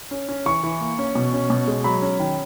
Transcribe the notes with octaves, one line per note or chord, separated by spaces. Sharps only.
C#4
C#4
E3 C#6
E3
A#3
C#4
B2
C#4
B2
G#3
F#3 B5
C#4
D#3